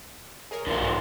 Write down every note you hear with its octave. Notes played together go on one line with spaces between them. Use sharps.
G#4 A#4 C#5
B1 D3 F3 A3
G#2